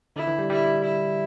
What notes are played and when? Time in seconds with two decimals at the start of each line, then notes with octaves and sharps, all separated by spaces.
0.16 D3 E4
0.27 E3
0.39 G3
0.50 G3 E4
0.84 E4